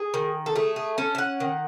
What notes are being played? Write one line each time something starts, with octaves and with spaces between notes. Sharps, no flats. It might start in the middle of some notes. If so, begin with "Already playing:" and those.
Already playing: G#4
D#3
A4
A3 G#4
G#4
C#4 A4
E5
F#5
D#3